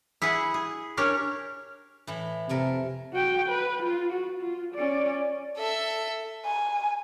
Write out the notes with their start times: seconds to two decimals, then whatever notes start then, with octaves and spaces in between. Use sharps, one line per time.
0.22 E4 G#4 B4 F#5
0.54 G#4
0.97 C#4 D4 G4 A#4 C#5
2.07 A2 E3
2.49 F2 C3 A3 A#4
3.13 F#4 G5
3.48 B4
3.82 F4
4.12 F#4
4.41 F4
4.74 C#4 D5
5.58 A4 E5
6.46 G#5